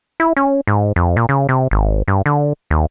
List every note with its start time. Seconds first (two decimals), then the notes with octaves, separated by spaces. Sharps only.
0.20 E4
0.37 C#4
0.67 G#2
0.96 F2
1.17 A#2
1.29 C#3
1.49 C3
1.71 G#1
2.08 G2
2.26 D3
2.70 D#2